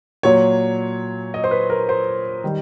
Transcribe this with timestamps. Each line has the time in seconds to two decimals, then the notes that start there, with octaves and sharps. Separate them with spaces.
0.23 A#2 F#3 C#5
1.34 D#5
1.44 C5
1.51 B4
1.70 A#4
1.89 C5
2.44 D#3 G3